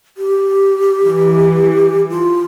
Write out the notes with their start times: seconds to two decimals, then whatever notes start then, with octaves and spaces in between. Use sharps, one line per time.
0.17 G4
1.05 E3
2.10 F4